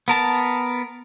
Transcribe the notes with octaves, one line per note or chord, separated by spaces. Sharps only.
B3 A#4 A5